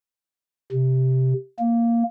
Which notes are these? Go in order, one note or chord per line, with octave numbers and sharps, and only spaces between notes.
C3
A#3